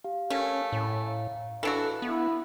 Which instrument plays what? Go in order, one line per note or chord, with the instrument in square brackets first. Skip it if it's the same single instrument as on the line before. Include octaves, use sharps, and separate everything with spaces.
[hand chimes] G4 F5
[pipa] A3 [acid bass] C#4 [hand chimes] A#4 C#5 F5
[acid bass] A2 [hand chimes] C#5 G#5
[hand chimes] F5 A#5
[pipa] E3 D4 F#4 [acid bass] A4
[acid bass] B3 [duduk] E4